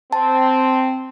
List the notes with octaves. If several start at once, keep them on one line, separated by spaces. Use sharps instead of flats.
C4 A5